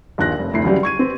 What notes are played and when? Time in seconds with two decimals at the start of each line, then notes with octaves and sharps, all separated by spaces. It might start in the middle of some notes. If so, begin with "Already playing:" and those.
0.18 A#1 D#2 F4 F#6 A#6
0.39 F1
0.53 F1 D2 E4 C7
0.64 C#2 E3 F#3 G3 G4 D5
0.83 C#6 G#6 D#7
0.99 C4 B4